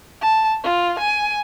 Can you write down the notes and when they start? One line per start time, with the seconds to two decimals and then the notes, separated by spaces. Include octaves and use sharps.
0.22 A5
0.64 F4
0.99 G#5